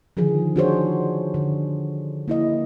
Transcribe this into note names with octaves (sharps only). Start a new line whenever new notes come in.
D3 D#3 F3 G#4
D4 D#4 F#4 G#4 C5 C#5
D3
A#3 E4 D#5